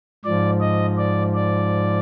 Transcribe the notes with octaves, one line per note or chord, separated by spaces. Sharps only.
G#2 F3 D5
D#5
D5
D5